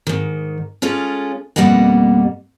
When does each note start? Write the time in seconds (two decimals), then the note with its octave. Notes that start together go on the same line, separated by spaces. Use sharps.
0.07 G#2 D#3
0.82 G#3 C#4 F4 G#4 A4
1.56 F2 B2 G3 A#3 D#5 F#5